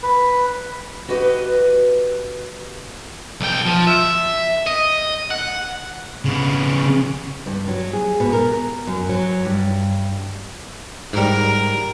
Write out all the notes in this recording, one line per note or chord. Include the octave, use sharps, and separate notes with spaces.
B4
F#4 G4 B4 D#5
B1 G5
F3
E5
D#5
F#5
C#3 B3
G2
F#3
G#4
B2
A#4
F#2
F#3
G2
G#2 G3 A#4